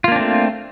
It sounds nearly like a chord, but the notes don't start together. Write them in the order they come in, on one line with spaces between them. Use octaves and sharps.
F4 A#3 D4 C4 A3